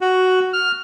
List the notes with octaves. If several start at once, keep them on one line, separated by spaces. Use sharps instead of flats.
F#4
F6